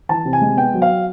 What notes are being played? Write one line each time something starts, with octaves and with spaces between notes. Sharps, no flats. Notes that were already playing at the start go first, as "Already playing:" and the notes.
E3 A5
C3
G#5
G#3
B3 G5
F#3
F5